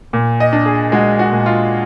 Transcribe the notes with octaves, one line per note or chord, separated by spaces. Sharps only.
A#2
D#5
D4
G#4
G#3 F#4
F#4
A#2
F4